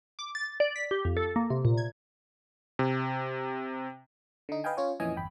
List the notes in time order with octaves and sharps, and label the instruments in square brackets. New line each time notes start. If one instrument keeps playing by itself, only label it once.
[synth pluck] D6
A6
D5
B6
G4
F2
A4
A#3
C3
A#2
G#6
[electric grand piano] C3
[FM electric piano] D3 D#4
B4 D#5 F5 G5 G#5
C#4 F4 C#5
F2 A#2 E3 C#4 D#5 G#5
G1 E2 G5 B5